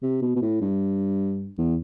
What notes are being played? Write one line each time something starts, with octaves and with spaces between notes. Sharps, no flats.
C3
B2
B2
A2
G2
E2